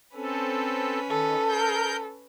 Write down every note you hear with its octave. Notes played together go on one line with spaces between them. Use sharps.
C4 C#4 A4 B4
D#3 A4
A#4 G6